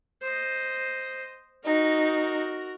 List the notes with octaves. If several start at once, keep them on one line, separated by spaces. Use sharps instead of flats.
C5 D#5
D#4 F#4 A#4